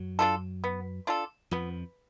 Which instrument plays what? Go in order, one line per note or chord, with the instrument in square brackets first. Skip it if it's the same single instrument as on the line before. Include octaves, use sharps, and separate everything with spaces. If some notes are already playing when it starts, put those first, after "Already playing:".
Already playing: [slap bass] F#2 F#3
[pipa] D4 F4 A4
B3
D4 F4 A4
[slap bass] F2 F3 [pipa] B3